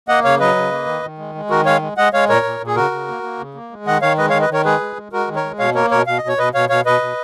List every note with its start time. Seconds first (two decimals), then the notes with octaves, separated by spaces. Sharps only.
0.08 A#3 D#5 F#5
0.24 C#3 C#5 F5
0.40 F#3 B4 D#5
0.56 C#3
0.72 A#3
0.87 D#3
1.03 D#3
1.18 G#3
1.35 G#3
1.50 D#3 F#4 A#4
1.65 G#3 C#5 F5
1.82 G#3
1.97 G#3 D#5 F#5
2.13 G#3 C#5 F5
2.29 A#2 A#4 C#5
2.45 A#2
2.60 A#2
2.67 G#4
2.76 C#3 F#4 A#4
2.91 C#3
3.08 A#3
3.23 A#3
3.39 C#3
3.55 A#3
3.71 G#3
3.86 D#3 D#5 F#5
4.01 D#3 C#5 F5
4.18 G#3 B4 D#5
4.30 D#3 C#5 F5
4.41 B4 D#5
4.50 D#3 A#4 C#5
4.65 G#3 G#4 B4
4.80 G#3
4.96 G#3
5.12 G#3 F#4 A#4
5.27 D#3
5.35 A#4 C#5
5.44 G#3
5.59 B2 C#5 F5
5.75 A#3 A#4 C#5
5.91 B2 A#4 C#5
6.07 B2 F5
6.18 D#5
6.23 B2
6.28 C#5
6.38 B2 B4 D#5
6.54 B2 C#5 F5
6.69 B2 C#5 F5
6.85 B2 B4 D#5
7.01 B2